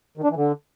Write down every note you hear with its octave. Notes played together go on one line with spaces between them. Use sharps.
D#3
D4
E3
D3